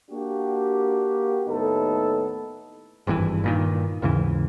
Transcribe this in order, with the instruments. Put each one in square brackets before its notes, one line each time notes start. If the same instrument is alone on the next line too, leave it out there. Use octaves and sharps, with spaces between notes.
[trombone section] A#3 D4 F#4 G4
D#2 A2 B3 D#4 A4
[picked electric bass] G#1 G2 C3 E3
G2 A#2 D#3
D#2 G#2 C#3 E3